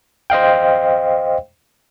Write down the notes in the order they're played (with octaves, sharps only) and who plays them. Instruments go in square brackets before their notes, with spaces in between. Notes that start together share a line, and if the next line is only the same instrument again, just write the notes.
[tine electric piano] C5 D#5 F5 G5